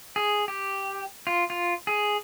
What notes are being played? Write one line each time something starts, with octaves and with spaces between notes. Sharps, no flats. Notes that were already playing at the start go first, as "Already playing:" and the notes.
G#4
G4
F4
F4
G#4